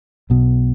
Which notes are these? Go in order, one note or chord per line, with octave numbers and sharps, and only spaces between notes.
B1 B2